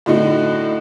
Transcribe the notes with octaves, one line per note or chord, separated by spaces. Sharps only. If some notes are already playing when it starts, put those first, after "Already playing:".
A2 D3 D#4 F#4